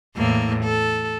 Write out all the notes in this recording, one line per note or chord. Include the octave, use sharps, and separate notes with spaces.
E2 A2 A#3
A4